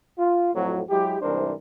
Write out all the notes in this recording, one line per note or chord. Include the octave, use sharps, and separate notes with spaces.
F4
F2 A2 F#3
F#3 G#3 E4 G4
C2 G#2 E3 D4 A#4 C5